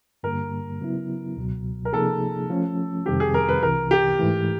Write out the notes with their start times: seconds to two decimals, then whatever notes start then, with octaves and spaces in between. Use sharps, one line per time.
0.23 G2 D3 G3 A#3 A#4
0.81 C#3 F#3 B3 E4
1.37 C#2 B2 F#3
1.85 A#4
1.93 C3 F3 A#3 D#4 G#4 A4
2.50 F3 A3 C#4
3.06 F2 C3 D#3 G3 C4 G4
3.20 G#4
3.34 A#4
3.48 B4
3.63 C2 C3 E3 A#4
3.91 G4
4.19 G#2 E3 A3